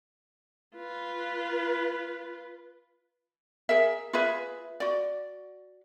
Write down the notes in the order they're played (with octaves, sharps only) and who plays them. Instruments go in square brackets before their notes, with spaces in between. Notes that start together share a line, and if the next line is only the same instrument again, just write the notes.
[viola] F4 B4
[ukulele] G#4 A#4 E5
F4 G#4 B4 E5
F#4 D5